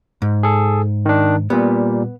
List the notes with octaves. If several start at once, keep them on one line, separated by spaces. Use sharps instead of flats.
G#2
G#4 A4
D#3 D4
A#2 G3 B3